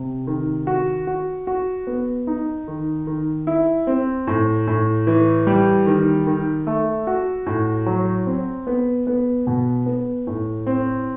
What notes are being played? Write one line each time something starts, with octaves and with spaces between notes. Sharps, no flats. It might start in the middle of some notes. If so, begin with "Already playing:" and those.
Already playing: C3
D#3
F#4
F#4
F#4
B3
D#4
D#3
D#3
E4
C4
A2
A2
E3
G3
D#3
D#3
A3
F#4
A2
F#3
C4
B3
B3
B2
B3
A2
C4